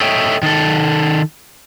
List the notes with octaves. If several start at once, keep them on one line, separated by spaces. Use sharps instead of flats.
A4 C#5 D#5 E5 G5
D#3 A4